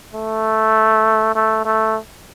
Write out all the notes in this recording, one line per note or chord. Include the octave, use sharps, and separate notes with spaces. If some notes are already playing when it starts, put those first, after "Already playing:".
A3
A3
A3